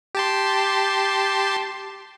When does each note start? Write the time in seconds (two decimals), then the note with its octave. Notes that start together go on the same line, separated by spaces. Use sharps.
0.15 G4 A5 C6